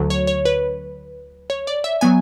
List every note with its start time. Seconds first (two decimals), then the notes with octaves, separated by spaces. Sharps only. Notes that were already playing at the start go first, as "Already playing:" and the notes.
Already playing: D2 D3 F#3
0.10 C#5
0.27 C#5
0.45 B4
1.50 C#5
1.67 D5
1.84 E5
2.01 F#3 B3 G#5